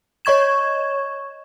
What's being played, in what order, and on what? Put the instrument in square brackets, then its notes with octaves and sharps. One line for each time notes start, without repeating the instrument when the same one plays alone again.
[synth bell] C#5 D#5 C#6 G#6 E7